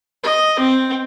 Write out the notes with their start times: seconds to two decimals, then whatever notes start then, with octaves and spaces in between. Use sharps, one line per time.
0.23 D#5
0.59 C4